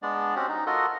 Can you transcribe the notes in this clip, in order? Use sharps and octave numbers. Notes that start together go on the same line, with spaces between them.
G#3 B3 D4 D5
C4 C#4 F#4 G4
D#4
F4 F#4 A4 A#4 D#5